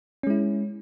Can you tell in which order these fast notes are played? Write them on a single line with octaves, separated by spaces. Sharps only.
C#4 G#3 E4